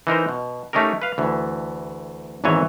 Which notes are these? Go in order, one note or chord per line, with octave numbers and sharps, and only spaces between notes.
E3 D#4 A#4 C5
B2
A3 C#4 D#4 G4 A#4
B4 F5
D2 E3
G#1 E2 A#2 E3 C#5 G#5